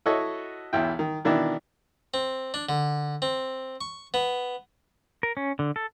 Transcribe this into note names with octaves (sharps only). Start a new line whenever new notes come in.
E4 F#4 A4 C#5 D#5
B1 E2 E4 G5
D#3
B2 D#3 E3 D4 E4
C4
D4
D3
C4
C#6
B3
A#4
C#4
D3
A4